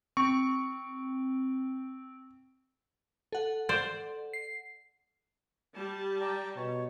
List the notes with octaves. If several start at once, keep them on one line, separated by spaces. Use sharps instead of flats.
C4 C#6
A4 F#5
C5 D5
C7
G3 A5
D5 G5 A#5
B2 C#5